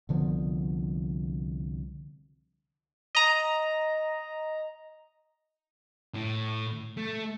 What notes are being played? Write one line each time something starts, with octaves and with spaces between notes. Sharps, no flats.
C2 D3 F3 B3
D#5 A#5
A2
A3